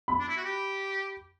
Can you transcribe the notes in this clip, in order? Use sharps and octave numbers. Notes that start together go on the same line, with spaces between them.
B5
D4
E4
F#4
G4